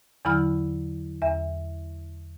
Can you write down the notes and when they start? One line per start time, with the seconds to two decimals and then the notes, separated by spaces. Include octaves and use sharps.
0.25 E2 D3 F#3 E4 B5 F6
1.22 E2 E5